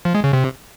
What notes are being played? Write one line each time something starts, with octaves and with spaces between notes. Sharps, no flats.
F3
G#3
C#3
C3